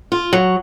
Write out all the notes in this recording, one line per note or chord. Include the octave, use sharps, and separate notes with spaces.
F4
F#3